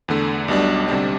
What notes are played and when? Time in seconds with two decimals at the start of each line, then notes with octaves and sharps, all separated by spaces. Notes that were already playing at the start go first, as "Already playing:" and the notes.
0.08 E2 D3 A3
0.48 B1 B2 G3 D4
0.88 D2 C3 G3 D4